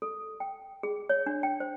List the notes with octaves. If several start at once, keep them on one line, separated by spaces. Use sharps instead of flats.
A4
G5
G#4
C#5
D4
G5
C5